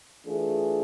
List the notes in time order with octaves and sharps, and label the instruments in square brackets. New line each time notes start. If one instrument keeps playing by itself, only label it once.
[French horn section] E3 A3 D4 F4 G#4